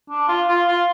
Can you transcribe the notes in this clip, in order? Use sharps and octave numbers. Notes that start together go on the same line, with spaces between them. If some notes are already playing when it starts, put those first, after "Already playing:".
D4
F4
F4
F4